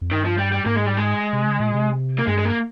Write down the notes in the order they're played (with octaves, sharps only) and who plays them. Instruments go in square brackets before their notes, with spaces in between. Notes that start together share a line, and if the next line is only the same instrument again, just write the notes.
[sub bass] F2
[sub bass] G2 [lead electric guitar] D#3
[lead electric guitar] F3
G3
G3
[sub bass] G#2 [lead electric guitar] A#3
[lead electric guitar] G#3
G3
G#3
[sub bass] C3
C#3
A#2
C3
[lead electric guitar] A#3
[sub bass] G2 [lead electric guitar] G#3
[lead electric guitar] G#3
A#3